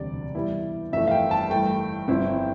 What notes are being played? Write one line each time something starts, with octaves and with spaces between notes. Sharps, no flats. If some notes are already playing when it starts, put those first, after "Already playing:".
Already playing: E1 D2 C3 G3 D4 D5
G2 E3 G3 B3 E4
G1 F2 E3 A3 E5
F5
G5
A5
G2 E3 A3 G5
G1 G2 F3 C4 E4